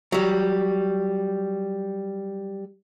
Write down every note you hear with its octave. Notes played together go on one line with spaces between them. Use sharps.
F#3 G3